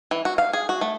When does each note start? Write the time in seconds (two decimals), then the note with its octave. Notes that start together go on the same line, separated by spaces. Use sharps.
0.11 E3
0.25 F#4
0.38 F5
0.53 G#4
0.69 F#4
0.81 A3